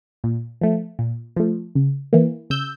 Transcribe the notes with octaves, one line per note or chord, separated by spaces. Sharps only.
A#2
F3 A3
A#2
F3 A3
C#3
E3 A#3
C#3 E6 G6